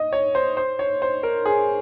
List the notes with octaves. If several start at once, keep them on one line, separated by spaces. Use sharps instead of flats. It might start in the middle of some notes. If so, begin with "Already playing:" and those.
Already playing: D#5
C#5
C5
C5
C#5
C5
A#4
G#4